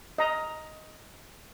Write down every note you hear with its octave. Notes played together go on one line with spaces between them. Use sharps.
D#5 A#5